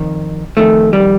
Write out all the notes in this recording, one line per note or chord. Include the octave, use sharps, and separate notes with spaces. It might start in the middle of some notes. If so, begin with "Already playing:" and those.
Already playing: F2 D#3
F2 D#3 A3
G3